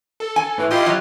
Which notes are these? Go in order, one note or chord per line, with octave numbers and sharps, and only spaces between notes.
A4
G#5
A2 E3
E4 F4 G4 D#5 C6
F#3